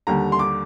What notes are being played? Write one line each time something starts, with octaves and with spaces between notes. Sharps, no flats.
D#2 D3 G3 A#5
C6
D6